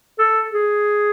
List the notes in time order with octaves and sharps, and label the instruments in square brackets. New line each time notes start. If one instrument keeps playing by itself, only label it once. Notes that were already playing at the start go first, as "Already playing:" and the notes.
[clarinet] A4
G#4